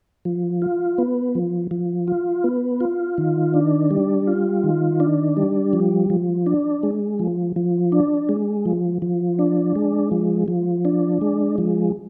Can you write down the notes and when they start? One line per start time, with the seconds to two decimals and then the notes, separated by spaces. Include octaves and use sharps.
0.25 F3
0.62 F4
0.98 B3
1.35 F3
1.71 F3
2.08 F4
2.44 B3
2.80 F4
3.18 D#3
3.54 D4
3.91 G3
4.27 F4
4.64 D#3
5.00 D4
5.37 G3
5.73 F3
6.10 F3
6.46 D4
6.83 G#3
7.19 F3
7.56 F3
7.92 D4
8.29 G#3
8.65 F3
9.02 F3
9.39 D4
9.76 G#3
10.11 F3
10.48 F3
10.85 D4
11.21 G#3
11.58 F3